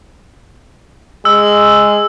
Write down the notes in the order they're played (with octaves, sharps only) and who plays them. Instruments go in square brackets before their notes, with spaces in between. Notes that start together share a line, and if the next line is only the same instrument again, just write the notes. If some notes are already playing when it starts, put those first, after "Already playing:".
[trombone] G#3 [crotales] E6